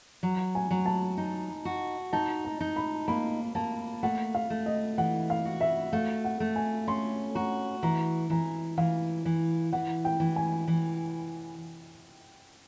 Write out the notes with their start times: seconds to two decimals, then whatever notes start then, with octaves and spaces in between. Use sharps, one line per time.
0.23 F#3
0.55 G#5
0.71 F#3
0.86 A5
1.18 D#4
1.65 F#4
2.13 D#4 A5
2.45 A#5
2.60 D#4
2.76 B5
3.08 A#3 B5
3.55 A#3 A5
4.03 A3 F#5
4.35 F5
4.50 A3
4.66 D#5
4.98 E3 F#5
5.30 F5
5.45 F#4
5.61 E5
5.93 A3 F5
6.24 F#5
6.40 A3
6.56 G#5
6.87 C#4 C6
7.35 F#4 A#5
7.83 E3 A#5
8.30 E3 A#5
8.77 E3 F5
9.25 E3
9.73 E3 F#5
10.05 G5
10.20 E3
10.36 G#5
10.68 E3